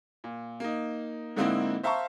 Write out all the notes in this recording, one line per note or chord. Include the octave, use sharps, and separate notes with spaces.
A#2
A#3 D#4
G#2 D3 A#3 C4 D#4 E4
C5 E5 F5 A5 A#5 C#6